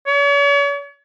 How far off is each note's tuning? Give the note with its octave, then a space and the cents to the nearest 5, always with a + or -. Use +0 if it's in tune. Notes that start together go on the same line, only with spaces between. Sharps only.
C#5 +40